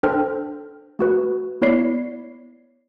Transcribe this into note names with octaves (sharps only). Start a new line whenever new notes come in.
D4 A4 C5 G5 F6
A3 F#4 B4
B3 E4 C#5 D5 C7